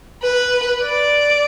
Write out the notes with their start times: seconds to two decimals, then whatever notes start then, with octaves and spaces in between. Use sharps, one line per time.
0.23 B4
0.83 D5